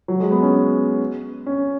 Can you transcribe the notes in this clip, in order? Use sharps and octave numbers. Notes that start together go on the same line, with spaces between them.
F#3
G#3
B3
C#4
C#4